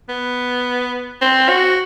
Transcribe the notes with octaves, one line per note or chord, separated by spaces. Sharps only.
B3
C4
F#4